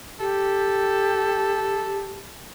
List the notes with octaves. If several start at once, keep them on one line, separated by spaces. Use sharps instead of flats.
G4 A4